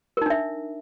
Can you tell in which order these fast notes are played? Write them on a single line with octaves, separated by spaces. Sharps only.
A#4 D#4 D4 E5